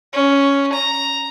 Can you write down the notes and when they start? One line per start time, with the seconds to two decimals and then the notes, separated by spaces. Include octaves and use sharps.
0.13 C#4
0.73 A#5